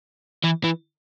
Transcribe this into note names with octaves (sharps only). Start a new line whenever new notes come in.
E3
E3